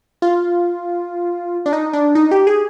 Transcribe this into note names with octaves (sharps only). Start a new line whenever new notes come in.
F4
D4
D#4
D4
D#4
G4
G#4